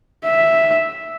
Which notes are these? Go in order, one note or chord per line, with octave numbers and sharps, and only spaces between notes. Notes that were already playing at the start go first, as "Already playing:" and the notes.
E5